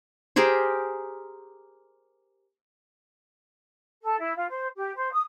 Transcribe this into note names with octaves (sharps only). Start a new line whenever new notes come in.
G4 G#4 A#4 C5
A4
E4
F4
C5
G4
C5
D#6